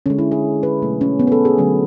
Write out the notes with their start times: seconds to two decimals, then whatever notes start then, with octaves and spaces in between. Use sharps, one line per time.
0.06 D3 G#3 C#4
0.19 E4
0.32 G#4
0.63 B4
0.82 B2 F#3 A3
1.01 C#4
1.20 B3
1.27 B4
1.32 A4
1.45 G#4
1.58 D3 F#3 A3 C#4